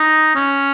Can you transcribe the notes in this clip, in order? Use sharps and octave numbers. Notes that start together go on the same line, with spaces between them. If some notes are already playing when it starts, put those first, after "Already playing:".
Already playing: D#4
C#4